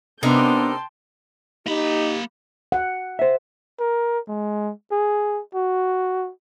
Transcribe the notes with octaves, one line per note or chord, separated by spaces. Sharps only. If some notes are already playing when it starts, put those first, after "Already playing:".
C3 B3 D4 D#4 A#4 G5 A5 C6
A#3 D#4 G4 B5
F#5
C5 E5
A#4
G#3
G#4
F#4